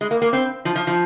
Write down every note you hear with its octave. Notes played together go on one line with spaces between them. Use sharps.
G#3
A#3
A#3
C4
F3
F3
F3